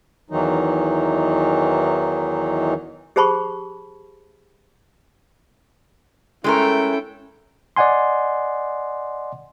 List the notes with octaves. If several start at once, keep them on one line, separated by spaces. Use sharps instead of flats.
E2 D#3 E3 F#3 D#4
G4 G#4 C5 A5 B5 C#6
G#3 A3 C#4 E4 A4 A#4 G5
D5 D#5 F#5 G#5 C6